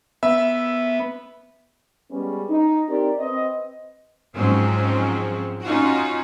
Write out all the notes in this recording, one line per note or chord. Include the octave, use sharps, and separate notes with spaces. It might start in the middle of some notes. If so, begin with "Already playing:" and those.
B3 E5 E6
G3 G#3 B3 C#4
D#4
C4 D#4 G4 A#4 D5
C4 B4 D#5
G#2 F3 F#3 G#3 C4 C#4
C#4 D#4 F4 F#4